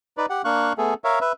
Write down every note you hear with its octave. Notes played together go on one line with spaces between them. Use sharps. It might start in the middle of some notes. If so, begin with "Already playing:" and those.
D#4 B4 D5
G4 F#5
A#3 D4 F5 C#6 F#6
A3 B3 G#4 A4
A#4 C#5 E5 F5
B4 E5